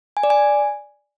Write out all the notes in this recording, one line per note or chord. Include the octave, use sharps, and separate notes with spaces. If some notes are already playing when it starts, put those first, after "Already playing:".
G#5
D5
G#5